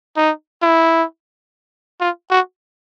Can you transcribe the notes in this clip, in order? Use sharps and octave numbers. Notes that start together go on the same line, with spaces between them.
D#4
E4
F4
F#4